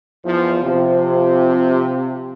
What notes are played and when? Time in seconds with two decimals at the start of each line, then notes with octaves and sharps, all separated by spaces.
0.25 E2 F3
0.62 C3 F3